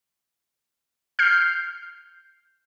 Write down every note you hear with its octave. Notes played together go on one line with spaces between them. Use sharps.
F6 G6 C7